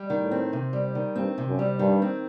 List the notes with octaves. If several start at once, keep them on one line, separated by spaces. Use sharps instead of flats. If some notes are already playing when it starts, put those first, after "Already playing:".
Already playing: G3
D#3
A2
C4
C3
G3
D#3
G2 C4
C3
F#2
G3
G2 D#3
C4